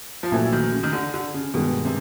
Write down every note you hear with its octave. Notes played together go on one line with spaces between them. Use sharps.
F3
A#1 A#2 E3 F#3 A3
E3
D#3
C#3
D#3
D3
D3
C#3
G2 B2 D#3 G#3 B3
C3